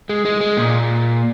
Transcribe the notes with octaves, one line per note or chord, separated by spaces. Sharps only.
G#3
G#3
G#3
A#2